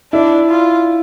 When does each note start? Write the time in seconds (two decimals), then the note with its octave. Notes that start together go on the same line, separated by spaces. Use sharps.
0.13 D4 E4
0.50 F4